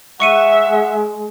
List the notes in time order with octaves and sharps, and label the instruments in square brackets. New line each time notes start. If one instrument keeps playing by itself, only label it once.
[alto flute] G#3 [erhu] E5 [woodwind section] F#5 [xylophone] C#6 C#7 D#7